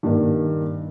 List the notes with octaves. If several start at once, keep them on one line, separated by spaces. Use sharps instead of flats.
G2 A#2 D#3